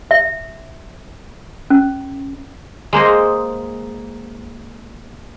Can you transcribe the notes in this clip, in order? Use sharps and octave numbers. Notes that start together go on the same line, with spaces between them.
E5
C#4
G#3 A#3 C5 D#5